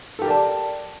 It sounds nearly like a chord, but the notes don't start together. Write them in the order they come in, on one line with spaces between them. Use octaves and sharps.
A4 G4 A#4 D5 A5